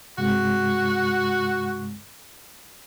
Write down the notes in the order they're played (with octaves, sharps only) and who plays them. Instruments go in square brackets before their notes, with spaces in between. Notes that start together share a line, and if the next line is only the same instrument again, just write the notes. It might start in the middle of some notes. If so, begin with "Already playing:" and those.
[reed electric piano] G2 C3 G#3 [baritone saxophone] F#4